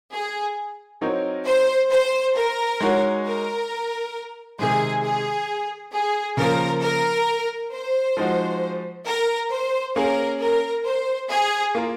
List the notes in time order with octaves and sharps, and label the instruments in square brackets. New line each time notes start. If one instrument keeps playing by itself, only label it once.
[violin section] G#4
[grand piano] F#3 C4 D#4 A#4 C#5
[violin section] C5
C5
A#4
[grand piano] G#3 D#4 F#4 C#5
[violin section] A#4
[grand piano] C3 D#3 G#3 [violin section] G#4
[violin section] G#4
G#4
[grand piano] C#3 F3 A#3 [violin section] A#4
[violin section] A#4
C5
[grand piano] F3 G#3 D#4 F#4
[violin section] A#4
C5
[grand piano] A#3 C#4 G#4 [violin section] A#4
[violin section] A#4
C5
G#4
[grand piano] A#3 F4 A#4